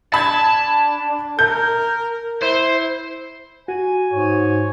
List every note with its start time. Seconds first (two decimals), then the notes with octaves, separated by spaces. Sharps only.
0.14 D4 A5 B5 G#6
1.39 A#4 G6
2.42 E4 C5
3.68 F#4 G#5
4.13 G#2 C#5